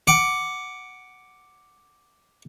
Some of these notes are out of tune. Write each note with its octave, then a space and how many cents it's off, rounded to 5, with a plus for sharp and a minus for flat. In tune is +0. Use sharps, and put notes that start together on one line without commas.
F#5 +5 D6 +0